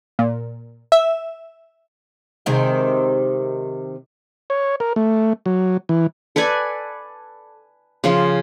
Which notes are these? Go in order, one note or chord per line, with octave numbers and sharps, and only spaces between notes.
A#2
E5
C3 D#3 G#3
C#5
A#4
A3
F#3
E3
A4 B4 D5 G#5
C#3 F3 F4